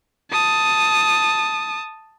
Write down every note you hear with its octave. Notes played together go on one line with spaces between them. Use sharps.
A5 D#6